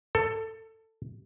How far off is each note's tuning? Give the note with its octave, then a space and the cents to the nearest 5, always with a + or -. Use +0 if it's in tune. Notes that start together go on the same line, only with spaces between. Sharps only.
A4 +15